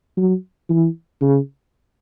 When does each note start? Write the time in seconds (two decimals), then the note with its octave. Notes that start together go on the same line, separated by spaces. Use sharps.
0.17 F#3
0.70 E3
1.21 C#3